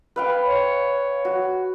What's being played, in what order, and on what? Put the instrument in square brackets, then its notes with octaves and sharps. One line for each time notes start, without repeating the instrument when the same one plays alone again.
[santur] B4 F5 G5
[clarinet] C#5
[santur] F#4